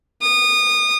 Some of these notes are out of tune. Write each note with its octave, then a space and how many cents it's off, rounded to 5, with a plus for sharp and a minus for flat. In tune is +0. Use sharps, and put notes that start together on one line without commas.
D#6 -25